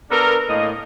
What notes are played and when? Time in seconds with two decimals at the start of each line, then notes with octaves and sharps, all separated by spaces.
0.10 B3 D4 A4 A#4
0.49 A2 A#3 D#5